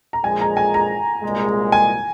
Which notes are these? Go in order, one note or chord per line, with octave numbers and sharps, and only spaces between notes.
A#5
A#1 A#2 F3 G#3 G#5
A#5
G#5
A#5
C2 A#2 G#3
G#5